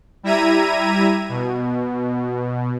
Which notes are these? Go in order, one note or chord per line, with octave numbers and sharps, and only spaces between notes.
G3 E4 E5 A#5 G#6 D#7
B2